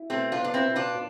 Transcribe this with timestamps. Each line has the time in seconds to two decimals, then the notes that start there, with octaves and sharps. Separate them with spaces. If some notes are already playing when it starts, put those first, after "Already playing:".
Already playing: E4
0.10 B2 A3 C4
0.32 D4 F4
0.39 B3
0.44 D4
0.54 C4 E4
0.69 B2
0.76 D4 F4